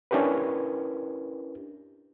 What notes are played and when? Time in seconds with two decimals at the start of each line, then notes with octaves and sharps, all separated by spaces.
0.11 C#4 D4 E4 G4 A#4 B4